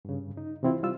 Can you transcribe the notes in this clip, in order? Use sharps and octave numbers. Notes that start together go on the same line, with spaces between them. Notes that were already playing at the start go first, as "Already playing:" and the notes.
G2 C#3
D#4
C3 E3 C4 E4 F4
G3 F4 E6